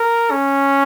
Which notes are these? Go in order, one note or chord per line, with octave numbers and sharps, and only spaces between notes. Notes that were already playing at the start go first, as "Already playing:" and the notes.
Already playing: A#4
C#4